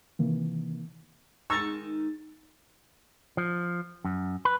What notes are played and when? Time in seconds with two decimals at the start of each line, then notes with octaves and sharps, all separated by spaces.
0.19 C3 D#3 E3 A#3
1.50 D#3 G#3 D#4 A#5 C#6 E6 A6
3.37 F3
4.05 F#2
4.45 B4